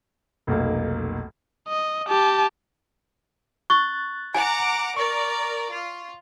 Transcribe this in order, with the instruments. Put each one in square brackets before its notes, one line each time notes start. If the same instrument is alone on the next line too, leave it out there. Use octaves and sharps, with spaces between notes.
[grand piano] F1 B1 A#3
[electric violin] D#5
G4 A5
[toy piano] C#6 [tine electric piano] F#6 A6
[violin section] F#5 A#5 D6 [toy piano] G#5
[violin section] A#4 D5 [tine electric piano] C#6
[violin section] F4